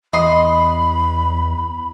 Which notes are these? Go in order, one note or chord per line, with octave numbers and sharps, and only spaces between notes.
E2 D#5 B5 C6